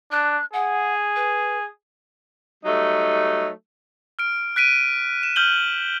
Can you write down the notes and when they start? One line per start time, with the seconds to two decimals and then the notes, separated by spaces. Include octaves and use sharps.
0.12 D4 F#6
0.53 G#4 F#5
1.16 B4
2.64 F#3 G3 A3 D#4
4.19 F6 D7
4.56 F#6 B6 D7 D#7
5.23 E7
5.36 F6 G6 F#7 G7